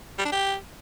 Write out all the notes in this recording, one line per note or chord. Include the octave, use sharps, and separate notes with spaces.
G3
D4
G4